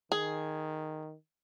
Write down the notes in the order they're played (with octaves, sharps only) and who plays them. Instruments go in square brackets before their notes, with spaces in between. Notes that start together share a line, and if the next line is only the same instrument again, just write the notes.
[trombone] D#3 [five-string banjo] G#4